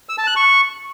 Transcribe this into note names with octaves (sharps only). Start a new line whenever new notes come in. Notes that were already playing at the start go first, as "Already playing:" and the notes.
E6
A5
F#6
C#6